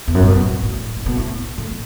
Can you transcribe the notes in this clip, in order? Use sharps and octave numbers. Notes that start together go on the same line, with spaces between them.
E2
F#2
A2
B2
A2
A2
B2
A2
A2